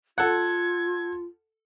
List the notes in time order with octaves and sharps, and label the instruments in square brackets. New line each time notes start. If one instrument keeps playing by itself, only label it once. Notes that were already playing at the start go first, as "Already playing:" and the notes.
[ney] F4 [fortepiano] A4 F#5 [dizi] G#6